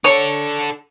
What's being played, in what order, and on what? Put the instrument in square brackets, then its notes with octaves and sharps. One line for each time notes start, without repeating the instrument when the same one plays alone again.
[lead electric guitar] D4 A4 [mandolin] C#5 C#6